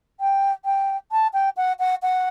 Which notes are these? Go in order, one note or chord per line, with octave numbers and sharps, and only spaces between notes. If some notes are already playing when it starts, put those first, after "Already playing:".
G5
G5
A5
G5
F#5
F#5
F#5